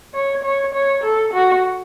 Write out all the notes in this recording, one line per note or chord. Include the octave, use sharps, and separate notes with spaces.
C#5
C#5
C#5
A4
F#4